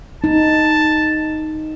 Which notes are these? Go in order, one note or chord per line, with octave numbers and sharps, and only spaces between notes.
D#4 A5